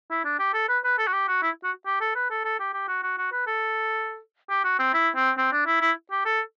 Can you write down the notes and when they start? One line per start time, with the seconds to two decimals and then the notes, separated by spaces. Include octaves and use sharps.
0.11 E4
0.25 D4
0.39 G4
0.54 A4
0.69 B4
0.84 B4
0.98 A4
1.07 F#4
1.13 G4
1.28 F#4
1.43 E4
1.64 F#4
1.86 G4
2.01 A4
2.15 B4
2.30 A4
2.45 A4
2.60 G4
2.74 G4
2.88 F#4
3.03 F#4
3.18 F#4
3.32 B4
3.47 A4
4.50 G4
4.64 F#4
4.79 C4
4.94 E4
5.16 C4
5.37 C4
5.52 D4
5.66 E4
5.81 E4
6.11 G4
6.25 A4